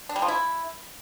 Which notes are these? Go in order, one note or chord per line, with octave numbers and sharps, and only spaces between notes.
D4
G3
F3
E4